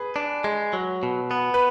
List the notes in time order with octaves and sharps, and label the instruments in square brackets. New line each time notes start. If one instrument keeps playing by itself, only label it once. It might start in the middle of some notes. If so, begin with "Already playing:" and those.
Already playing: [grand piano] G#4 B4
[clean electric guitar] D4
G#3
F#3
B2
B3
[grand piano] B4